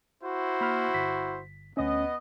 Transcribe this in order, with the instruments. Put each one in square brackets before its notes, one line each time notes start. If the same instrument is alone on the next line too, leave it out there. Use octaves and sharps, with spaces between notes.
[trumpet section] E4 F#4 C5
[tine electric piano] A#3 B5 F6
G1 B6
[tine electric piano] D2 C#4 [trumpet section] B3 D#5